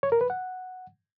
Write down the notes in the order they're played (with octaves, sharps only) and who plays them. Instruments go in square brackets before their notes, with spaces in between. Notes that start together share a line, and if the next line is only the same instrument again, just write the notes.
[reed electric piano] C#5
A#4
B4
F#5